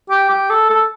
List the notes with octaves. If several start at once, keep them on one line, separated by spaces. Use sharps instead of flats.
G4
G4
A4
A4